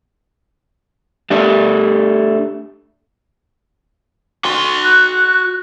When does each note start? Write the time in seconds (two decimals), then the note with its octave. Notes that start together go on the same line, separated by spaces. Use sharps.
1.30 A3 D4 G4 D5
4.45 F#4 C6
4.84 F#6